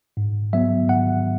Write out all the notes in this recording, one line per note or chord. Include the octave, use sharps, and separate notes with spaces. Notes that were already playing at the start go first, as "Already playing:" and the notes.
G#2
F#3 B3 E5
G#2 F#5